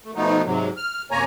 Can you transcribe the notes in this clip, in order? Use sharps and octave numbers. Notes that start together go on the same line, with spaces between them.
A3
B2 F3 A3 B3 D#4
G#2 C3 F#3
F6
F#2 C3 A#3 C#5 G#5 A#5